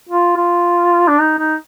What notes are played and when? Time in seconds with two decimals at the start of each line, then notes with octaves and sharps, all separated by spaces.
0.09 F4
0.37 F4
1.08 D4
1.20 D#4
1.39 D#4